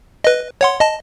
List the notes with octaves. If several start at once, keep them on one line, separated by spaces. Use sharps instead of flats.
B4 D#5
C#5 F#5 C6
D#5 A5